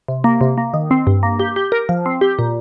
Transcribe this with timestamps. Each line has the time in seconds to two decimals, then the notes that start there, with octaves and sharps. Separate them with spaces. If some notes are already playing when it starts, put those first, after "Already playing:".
0.08 C3
0.24 A#3
0.41 C3
0.58 A#3
0.74 D#3
0.91 C4
1.07 G2
1.23 A#3
1.40 G4
1.56 G4
1.72 A#4
1.89 F3
2.06 C4
2.21 G4
2.39 A#2